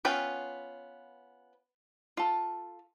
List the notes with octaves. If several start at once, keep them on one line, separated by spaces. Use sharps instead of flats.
B3 C#4 F4 B4 G5
F4 A4